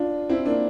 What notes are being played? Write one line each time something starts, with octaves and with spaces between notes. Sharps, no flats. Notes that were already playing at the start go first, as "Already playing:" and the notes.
Already playing: D4 F4
C4 E4
A#3 D4